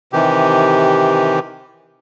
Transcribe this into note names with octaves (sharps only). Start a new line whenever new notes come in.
C3 D#3 E3 G4